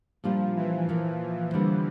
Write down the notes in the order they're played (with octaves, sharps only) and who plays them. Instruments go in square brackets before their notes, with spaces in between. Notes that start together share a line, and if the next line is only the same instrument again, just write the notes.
[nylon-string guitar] A#2 G3 D4 F4 [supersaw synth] F3
[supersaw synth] E3
[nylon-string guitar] A#2 F3 A#3
D3 G3 A#3